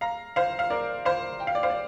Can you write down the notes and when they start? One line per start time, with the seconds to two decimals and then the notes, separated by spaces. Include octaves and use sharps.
0.01 F5 A#5
0.36 C5 F5
0.59 F5
0.70 A#4 D5
1.05 C5 F5
1.40 G5
1.47 F5
1.55 D5
1.63 C5 F5
1.70 D5